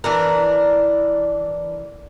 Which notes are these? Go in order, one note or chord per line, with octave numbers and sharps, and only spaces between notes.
E3 D4 A#4